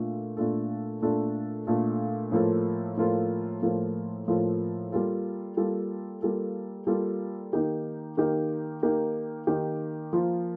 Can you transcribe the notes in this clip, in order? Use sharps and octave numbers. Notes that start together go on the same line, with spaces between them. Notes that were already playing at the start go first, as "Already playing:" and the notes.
Already playing: A#2 A3 D4 F4 A4
A#2 A3 D4 F4 A4
A#2 A3 D4 F4 A4
A#2 A3 D4 F4 A4
A2 F3 A#3 F4 A4
A2 F3 A#3 F4 A4
A2 F3 A#3 F4 A4
A2 F3 A#3 F4 A4
G3 A#3 F4 A4
G3 A#3 F4 A4
G3 A#3 F4 A4
G3 A#3 F4 A4
D#3 A#3 D#4 G4 A#4
D#3 A#3 D#4 G4 A#4
D#3 A#3 D#4 G4 A#4
D#3 A#3 D#4 G4 A#4
F3 A#3 F4 A#4